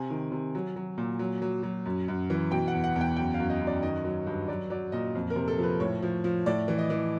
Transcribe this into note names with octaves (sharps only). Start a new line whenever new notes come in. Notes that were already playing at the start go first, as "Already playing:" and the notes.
Already playing: C3 G#5
D#3
C3
F#3
F#3
A#2
F#3
F#3
F#3
F#2
F#2
E3
B2 G5
F#5
E2
F#5
E2
G5
F#2 G5
F#2 F5
D#5
F#2
D5
D#3 D#5
F#3
G2
F#3 D5
F#3 D5
A#2 D#5
F2
A#4
C3
A4
F3 B4
A2 C#5
F3
F3
A2 D5
E3
D#5
E3